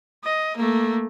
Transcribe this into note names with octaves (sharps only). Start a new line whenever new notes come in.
D#5
A3 A#3